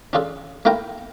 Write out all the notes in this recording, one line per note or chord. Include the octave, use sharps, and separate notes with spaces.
C#4 D4 F4 G#4 A4
A3 A#3 E4 F4 A#4 G5